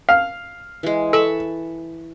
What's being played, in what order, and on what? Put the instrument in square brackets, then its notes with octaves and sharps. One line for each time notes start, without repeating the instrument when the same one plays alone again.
[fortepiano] F5
[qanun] E3 G#3
[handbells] A4 [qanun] A5 B5 C#6